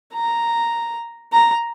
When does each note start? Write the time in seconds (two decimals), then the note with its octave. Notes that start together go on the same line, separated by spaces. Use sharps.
0.14 A#5
1.33 A#5